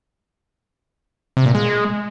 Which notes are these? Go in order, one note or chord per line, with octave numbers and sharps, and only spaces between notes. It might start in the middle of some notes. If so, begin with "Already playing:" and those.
C3
A#2
G#3